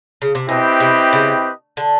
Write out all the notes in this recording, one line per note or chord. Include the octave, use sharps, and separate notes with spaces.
C#3
C3
B2 C4 E4 G4 B4 D#5
C3
C#3
D3